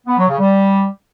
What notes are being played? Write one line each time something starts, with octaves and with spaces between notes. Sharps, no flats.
B3
F#3
C#3
G3